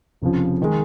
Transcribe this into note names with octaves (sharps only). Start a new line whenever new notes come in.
F1 F2 C#3 F3
D#3 G#3